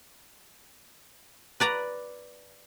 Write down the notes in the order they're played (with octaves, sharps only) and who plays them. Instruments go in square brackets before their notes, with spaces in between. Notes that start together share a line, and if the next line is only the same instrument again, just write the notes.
[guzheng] B4 D5 A#5